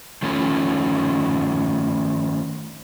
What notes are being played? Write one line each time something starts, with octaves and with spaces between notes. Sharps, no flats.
D#3 F3 A3 C#4